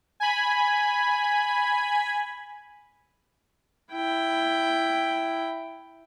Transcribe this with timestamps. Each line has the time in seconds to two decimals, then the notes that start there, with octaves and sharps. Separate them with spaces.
0.20 G#5 B5
3.93 E4 G5